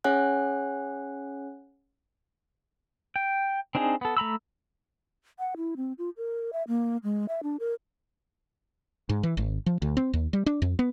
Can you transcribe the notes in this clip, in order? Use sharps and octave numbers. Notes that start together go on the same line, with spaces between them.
C#4 G#4 C#5 F#5 G#5 F#6
G5
C4 D4 D#4 G#4
B3 A4
A3 A#5 B5 E6
F#5
E4
C4
F4
A#4
E5
A#3
G#3
E5
D4
A#4
G#2
E3
G#1
F3
D2
C4
D#2
G3
D4
F2
B3